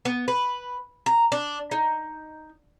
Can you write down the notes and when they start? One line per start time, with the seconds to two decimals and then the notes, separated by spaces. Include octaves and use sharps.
0.05 B3
0.28 B4
1.06 A#5
1.32 D4
1.71 D#4